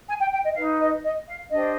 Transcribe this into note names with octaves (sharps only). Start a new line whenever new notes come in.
G#5
G5
G5
D#5
D#4 B4 F5
D#5
D#5
F5
D4 G4 C5 D#5